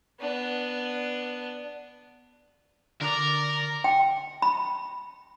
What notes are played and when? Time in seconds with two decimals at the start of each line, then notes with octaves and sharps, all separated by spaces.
0.20 B3 D4
3.01 D3 A#4 D5 A#5
3.84 G5
4.42 B5